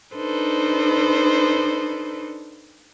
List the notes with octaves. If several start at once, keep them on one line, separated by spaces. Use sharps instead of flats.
D4 D#4 A4 B4 C5